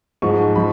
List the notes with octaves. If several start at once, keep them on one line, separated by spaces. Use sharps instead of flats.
G#2 F3 G#3 C#6
F3 G#3 B5